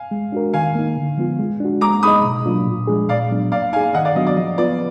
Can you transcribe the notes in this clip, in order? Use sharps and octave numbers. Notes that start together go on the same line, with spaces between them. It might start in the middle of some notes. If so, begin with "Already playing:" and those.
Already playing: F5 G#5
G#3
D4 F#4 A#4
D#3 F5 G#5
A#3 D#4
D3
F3 G#3 B3 F4
G#3
D4 F#4
G#3 A#5 D6
D#4 G#4 D#5 B5 D#6
B2
F#3 A#3 D4 F4
A#2
F3 G#3 D4 G#4
A#2 D5 F5
F#3 B3 D4
A#3 D5 F5
D#4 G#4 F5 G#5
D#3 D#5 F#5
D5 F5
F#3 B3 D4 F#4 D#5
D5
F3 D#5
B3 F4 B4 D5